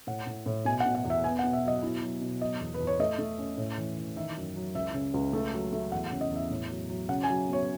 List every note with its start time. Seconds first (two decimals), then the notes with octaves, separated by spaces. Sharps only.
0.07 A2 F#5
0.27 A2
0.46 A2
0.65 B2 G#5
0.80 F#5
0.86 B2
0.95 F#5
1.04 E2
1.10 E5
1.24 B3 G#5
1.39 F#5
1.44 B2
1.53 E5
1.63 F#3 D#5
1.82 B2 E4
2.02 F#3
2.21 B2
2.41 F#3 D#5
2.61 E2
2.74 B4
2.80 E2
2.87 C#5
3.00 A3 D#5
3.19 A3
3.38 C#4
3.58 A2
3.78 E3
3.97 E3
4.16 D#3 E5
4.36 F#2
4.56 F#3
4.75 C#2 E5
4.94 C#3
5.14 C#2
5.33 A3
5.53 F#3
5.73 A3
5.92 E2 F#5
6.06 F#5
6.12 C#3
6.21 D#5
6.31 E2 E5
6.50 A2
6.70 F#3
6.90 F#3
7.09 C#3 F#5
7.24 G#5
7.28 F#3
7.48 B3
7.53 C#5